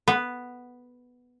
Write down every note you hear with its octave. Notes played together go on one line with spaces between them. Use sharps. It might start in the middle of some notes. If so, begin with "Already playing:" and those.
B3